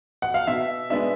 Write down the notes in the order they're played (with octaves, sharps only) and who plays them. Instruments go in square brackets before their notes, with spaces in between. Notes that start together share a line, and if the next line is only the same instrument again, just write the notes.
[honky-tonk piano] F#5
F5
[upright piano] B2 [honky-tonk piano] E5
[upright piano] G#3 B3 D4 [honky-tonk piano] E5